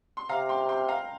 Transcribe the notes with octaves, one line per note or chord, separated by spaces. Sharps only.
C6
C3 F5 A#5
G5 C6
G5 C6
F5 A#5